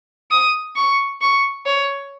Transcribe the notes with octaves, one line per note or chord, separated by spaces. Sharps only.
D#6
C#6
C#6
C#5